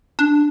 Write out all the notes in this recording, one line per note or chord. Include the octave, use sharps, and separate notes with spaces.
D4